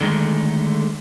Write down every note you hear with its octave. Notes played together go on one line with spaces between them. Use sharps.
D3 D#3 G#3 A3